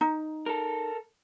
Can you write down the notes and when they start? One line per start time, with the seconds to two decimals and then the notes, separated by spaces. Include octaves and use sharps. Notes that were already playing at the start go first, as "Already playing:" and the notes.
0.01 D#4
0.46 A4 A#4